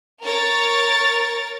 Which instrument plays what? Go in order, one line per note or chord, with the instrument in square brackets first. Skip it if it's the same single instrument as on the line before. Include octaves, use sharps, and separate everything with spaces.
[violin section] A#4 C#5 A6